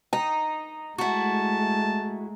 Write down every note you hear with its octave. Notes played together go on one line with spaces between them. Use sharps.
D#4 A#5
G#3 A3 E4 F#4 A5